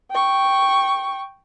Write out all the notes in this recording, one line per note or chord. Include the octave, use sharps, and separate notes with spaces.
G5 C#6